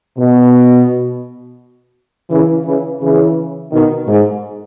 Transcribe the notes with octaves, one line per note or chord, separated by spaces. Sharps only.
B2
C#3 E3
C#3 E3
C#3 E3
B2 D#3
G#2